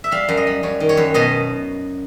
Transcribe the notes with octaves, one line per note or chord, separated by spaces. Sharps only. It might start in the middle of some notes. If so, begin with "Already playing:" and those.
E5
G3 F5
F#2
D#5
G3
F#2 C#5
D#3
C#5
F#2
B2 D#5